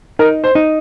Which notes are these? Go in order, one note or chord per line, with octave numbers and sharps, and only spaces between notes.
D#4 A#4
C5
D#4